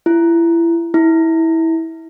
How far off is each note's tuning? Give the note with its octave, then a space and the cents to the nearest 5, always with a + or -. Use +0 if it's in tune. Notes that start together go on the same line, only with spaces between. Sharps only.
E4 +25
E4 -20